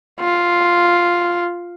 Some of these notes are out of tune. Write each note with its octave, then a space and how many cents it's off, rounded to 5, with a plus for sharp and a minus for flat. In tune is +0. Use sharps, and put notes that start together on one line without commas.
F4 +0